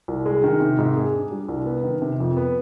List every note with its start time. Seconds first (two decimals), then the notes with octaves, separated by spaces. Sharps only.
0.08 C2
0.26 G#3
0.44 D#3
0.60 C3
0.78 G#2
0.97 G#4
1.14 D4
1.31 G3
1.48 C2
1.66 B3
1.84 D#3
2.02 C3
2.20 F2
2.37 B3